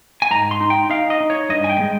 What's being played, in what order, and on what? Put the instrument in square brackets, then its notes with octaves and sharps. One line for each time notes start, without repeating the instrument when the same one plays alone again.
[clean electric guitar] G#5
G#2 A#5
C6
D#4
G5
D#4 F5
D#5
D#4
C#5
G2 D#5
G#5
G5
G#3